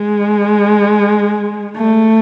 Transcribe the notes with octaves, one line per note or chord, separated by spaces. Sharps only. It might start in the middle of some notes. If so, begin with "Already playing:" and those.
Already playing: G#3
A3